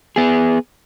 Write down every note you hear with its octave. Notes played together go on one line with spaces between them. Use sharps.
B3 G#4